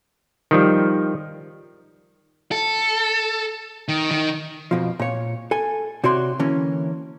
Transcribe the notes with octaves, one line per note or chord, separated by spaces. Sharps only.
D#3 F3 G3
A4
D#3
D#3
F2 B2 F3
A#2 C#5
A4 G#5
C3 F#4 C#5 D5 C6
D3 E3 A#3 C#4